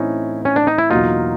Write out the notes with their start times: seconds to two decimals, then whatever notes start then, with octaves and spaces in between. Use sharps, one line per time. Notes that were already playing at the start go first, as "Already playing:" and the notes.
Already playing: A2 E3 A3 C4 C#4 D#4 E4
0.45 C#4
0.56 D4
0.67 D#4
0.78 E4
0.90 E2 B2 F#3 A#3 D#4 F4